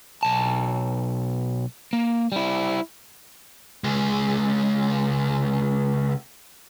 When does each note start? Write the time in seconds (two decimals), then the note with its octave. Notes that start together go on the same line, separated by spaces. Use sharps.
0.23 B1 A5
1.93 A#3
2.32 G3 E4
3.84 C#2 G#3